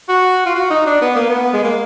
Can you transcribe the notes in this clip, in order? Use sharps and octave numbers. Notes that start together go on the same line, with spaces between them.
F#4
F4
F#4
D#4
D4
B3
A#3
B3
G#3
A#3